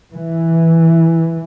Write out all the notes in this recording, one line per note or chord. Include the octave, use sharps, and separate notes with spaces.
E3